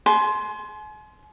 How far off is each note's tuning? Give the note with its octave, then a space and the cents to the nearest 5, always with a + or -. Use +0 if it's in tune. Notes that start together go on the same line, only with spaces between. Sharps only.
G#5 +40 C6 +0